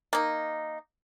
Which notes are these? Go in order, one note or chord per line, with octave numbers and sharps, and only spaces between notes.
A#3 D#4